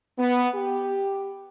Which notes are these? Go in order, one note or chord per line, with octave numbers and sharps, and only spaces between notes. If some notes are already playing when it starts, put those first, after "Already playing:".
B3
G4